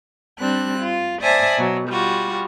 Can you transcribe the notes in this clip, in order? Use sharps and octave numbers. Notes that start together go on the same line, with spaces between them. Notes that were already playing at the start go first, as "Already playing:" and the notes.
G3 C4 D4 F#6
F4
C5 D5 E5 G#5 A5 D#6
B2 F#3
G3 F4 F#4